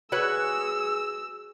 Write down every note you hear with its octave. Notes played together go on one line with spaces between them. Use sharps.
F#4 G#4 B4 C#5 E6